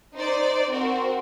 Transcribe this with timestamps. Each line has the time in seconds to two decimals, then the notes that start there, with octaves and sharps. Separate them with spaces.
0.14 D#4 C5 D5
0.69 C4 F#4 A#4